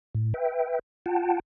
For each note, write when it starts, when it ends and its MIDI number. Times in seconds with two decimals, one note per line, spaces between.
0.15 0.33 45
0.34 0.79 71
0.34 0.79 76
0.34 0.79 79
1.06 1.40 65
1.06 1.40 78
1.06 1.40 79
1.06 1.40 81